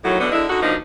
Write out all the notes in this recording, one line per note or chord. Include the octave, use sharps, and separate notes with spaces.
D#2 A2 D#3 F#3
B2 D3 E3 B3
D3 G#3 D4 E4
D3 D#4 F#4
B2 F3 A#3 D4 D#4